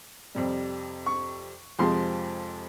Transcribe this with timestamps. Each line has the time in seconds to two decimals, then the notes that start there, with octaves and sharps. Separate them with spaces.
0.35 F2 C3 G3
1.06 C#6
1.79 F2 C3 F3 G#3 C6